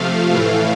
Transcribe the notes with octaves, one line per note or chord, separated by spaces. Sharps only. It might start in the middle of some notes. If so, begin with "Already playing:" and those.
Already playing: C3 F3 A3 F5
A2 E3 A3